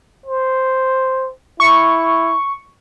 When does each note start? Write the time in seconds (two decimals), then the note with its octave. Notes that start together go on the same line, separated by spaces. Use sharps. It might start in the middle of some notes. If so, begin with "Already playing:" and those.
0.26 C5
1.60 E4 C#6